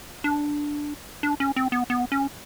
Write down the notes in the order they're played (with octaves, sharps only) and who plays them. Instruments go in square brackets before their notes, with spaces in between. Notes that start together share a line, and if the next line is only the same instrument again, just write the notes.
[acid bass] D4
D4
C#4
C4
B3
B3
C#4